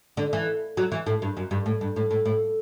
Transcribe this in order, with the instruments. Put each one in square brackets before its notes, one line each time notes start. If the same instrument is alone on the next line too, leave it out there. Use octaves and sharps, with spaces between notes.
[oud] D3
E3
F#3
E3
A2
G2
F#2
G2
A2
G2
A2
A2
A2